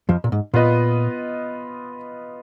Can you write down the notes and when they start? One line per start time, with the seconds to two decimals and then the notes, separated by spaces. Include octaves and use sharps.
0.09 F2 F3
0.24 A#2
0.32 G#2
0.54 A#2 B3 F4 B4 D#5